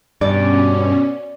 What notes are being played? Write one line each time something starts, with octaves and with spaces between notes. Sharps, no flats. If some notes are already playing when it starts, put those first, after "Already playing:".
G2 B2 C#4 D5